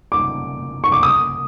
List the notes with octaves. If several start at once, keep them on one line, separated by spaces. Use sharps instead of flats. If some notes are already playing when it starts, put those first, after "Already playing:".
D6
C#6
D6
D#6